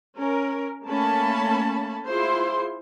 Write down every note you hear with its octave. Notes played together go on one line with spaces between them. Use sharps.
C#4 A#4
A3 A#3 C#4 A5 B5
E4 F4 G#4 C5 C6